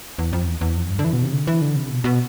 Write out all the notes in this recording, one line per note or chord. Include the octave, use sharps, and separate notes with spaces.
E2
F2
E2
E2
F2
G2
D3
E3
B2
C3
D3
E3
D3
C3
B2
B2